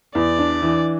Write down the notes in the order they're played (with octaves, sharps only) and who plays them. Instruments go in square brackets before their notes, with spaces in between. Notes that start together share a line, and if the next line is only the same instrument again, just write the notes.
[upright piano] E2 [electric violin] D5
[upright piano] D4
E3